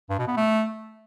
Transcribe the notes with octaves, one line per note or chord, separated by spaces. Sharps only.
G2
B2
B3
A3